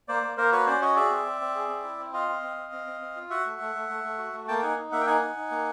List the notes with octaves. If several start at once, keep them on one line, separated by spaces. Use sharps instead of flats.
A#3 C5 D5
A#3
A#3 A#4 C5
F#4 B4 C#5
C#4 C5 D5
F#4 C#5 D#5
G#4 D5 E5
C4
C4
C4
G#4
C4
E4
C4
F4 D#5 F5
C4
C4
C4
C4
C4
C4
F4
F#4 E5 F#5
A3
A3
A3
A3
A3
F#4
A3
A#3 G5 A5
G5
D#4 F#5 G#5
D#4
A#3 E5 F#5
G5
D#4 F#5 G#5
D#4
D#4
A#3